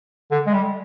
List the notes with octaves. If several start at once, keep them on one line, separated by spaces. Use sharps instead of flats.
D3
G#3
G3